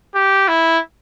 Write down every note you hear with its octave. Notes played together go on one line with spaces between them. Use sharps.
G4
E4